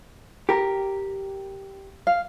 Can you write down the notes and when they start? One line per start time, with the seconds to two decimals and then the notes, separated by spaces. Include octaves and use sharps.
0.49 G4 A#4
2.07 F5